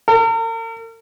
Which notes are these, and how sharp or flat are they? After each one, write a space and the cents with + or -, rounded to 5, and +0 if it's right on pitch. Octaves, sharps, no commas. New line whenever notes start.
A#4 -45